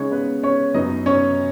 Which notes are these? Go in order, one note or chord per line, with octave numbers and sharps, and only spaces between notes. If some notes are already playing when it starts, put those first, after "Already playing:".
Already playing: C#3 G#3 C#4 D#4 C#5
B3 B4
C#4 C#5
F#2 F#3 B3 D#4 D#5
C#4 C#5